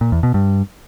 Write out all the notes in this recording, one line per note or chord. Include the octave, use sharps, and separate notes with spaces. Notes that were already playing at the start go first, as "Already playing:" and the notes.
A#2
E2
B2
G2